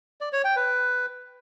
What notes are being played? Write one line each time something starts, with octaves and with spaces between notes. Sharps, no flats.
D5
C#5
G5
B4